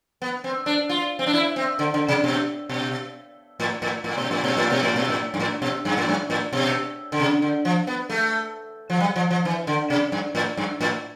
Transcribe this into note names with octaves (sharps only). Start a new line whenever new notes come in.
B3
C4
D4
F4
C4
D4
E4
C4
D3
D3
C3
B2
B2
A2
A2
A2
B2
A2
B2
A2
B2
A2
B2
A2
G2
A2
B2
G2
A2
G2
A2
B2
D3
C3
D3
F3
B3
A3
F3
G3
F3
F3
E3
D3
C3
G2
A2
G2
A2